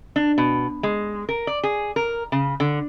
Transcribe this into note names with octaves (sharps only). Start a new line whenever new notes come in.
D4
B2
G#3
A#4
D5
G#4
A#4
C#3
D3